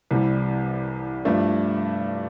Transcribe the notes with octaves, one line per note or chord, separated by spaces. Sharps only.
C2 C3 E3 G3
G2 F3 A3 D4